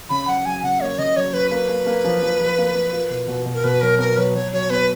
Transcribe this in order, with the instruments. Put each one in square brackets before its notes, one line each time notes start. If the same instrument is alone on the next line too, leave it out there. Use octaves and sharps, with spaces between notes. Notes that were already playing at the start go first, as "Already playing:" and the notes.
[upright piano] C#3 [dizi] B5
[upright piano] F#3 [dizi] F#5
[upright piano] F#3 [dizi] G#5
[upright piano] C#3 [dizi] F#5
[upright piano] A#3 [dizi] C#5
[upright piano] C#3 [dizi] D#5
[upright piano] F#3 [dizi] C#5
[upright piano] F#3 [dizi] B4
[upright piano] A#3 [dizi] B4
[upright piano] A#3
A#3
F3
F3
F3
A#3
A#3
F4
B2
B2
B2
[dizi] A#4
[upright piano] B2 [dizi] B4
[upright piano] F#3 [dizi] A#4
[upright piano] B3 [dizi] A#4
[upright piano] F#3 [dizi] B4
[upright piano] F#3 [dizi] C#5
[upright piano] F#3 [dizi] C#5
[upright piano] B3 [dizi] B4